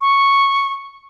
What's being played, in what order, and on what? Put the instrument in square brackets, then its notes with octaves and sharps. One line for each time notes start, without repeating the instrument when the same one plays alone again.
[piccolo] C#6